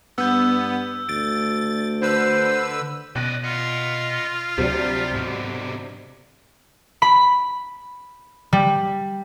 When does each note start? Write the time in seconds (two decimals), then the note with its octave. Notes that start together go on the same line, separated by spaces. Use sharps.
0.18 G2 B3 E6 G6
1.09 D2 A6 D7
2.02 D3 B4 C5 E6
3.16 B2 D5 D#5 F#6 A#6
3.44 F4 D#5 F#5
4.58 D2 C3 F#3 G3 D4
5.14 G#2 B2 D3
7.02 B5
8.53 G3